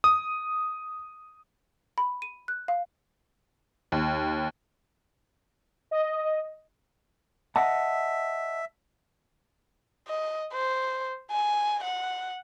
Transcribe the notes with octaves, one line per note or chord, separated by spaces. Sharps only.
D#6
B5
D#7
F#6
F5
D#2
D#5
D#5 E5 F#5 A5
D#5
C5
G#5
F#5